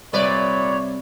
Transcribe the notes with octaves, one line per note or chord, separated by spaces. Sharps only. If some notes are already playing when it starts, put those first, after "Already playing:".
C2 A#2 B4 C#5 D5 E5